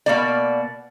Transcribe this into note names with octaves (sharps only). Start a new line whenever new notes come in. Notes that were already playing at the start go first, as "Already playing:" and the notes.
B2 A#3 D5